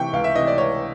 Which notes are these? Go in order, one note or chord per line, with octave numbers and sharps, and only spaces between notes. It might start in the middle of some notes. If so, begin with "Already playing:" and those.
Already playing: C3 E3 G5 C#6
C#2 F5
E5
C3 E3 D#5
D5
C#2 C#5